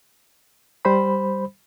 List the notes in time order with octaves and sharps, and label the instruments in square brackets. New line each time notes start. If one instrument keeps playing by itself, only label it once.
[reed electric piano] G3 C5 B5